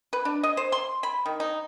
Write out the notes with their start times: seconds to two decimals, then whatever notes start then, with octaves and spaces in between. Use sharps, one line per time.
0.13 B4
0.25 D4
0.43 D#5
0.57 C5
0.72 C6
1.03 B5
1.26 D#3
1.40 D#4